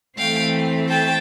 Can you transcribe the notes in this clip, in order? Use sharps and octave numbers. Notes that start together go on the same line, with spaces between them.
E3 A3 C4 F5 G5
G5 A5